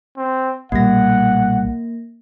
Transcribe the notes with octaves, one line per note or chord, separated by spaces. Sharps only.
C4
B1 A#2 G3 A#3 F#5 A#6